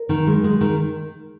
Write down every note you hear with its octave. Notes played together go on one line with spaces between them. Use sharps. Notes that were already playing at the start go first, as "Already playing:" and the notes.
Already playing: A#4
D#3
G#3
G#3
D#3